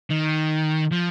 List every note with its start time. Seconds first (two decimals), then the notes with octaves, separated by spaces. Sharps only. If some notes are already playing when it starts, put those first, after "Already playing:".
0.10 D#3
0.91 F3